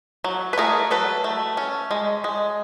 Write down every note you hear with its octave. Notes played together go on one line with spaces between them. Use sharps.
F#3
B4
A3 G#4 A#4
F#3 A4 B4
A3
C#4
G#3
G#3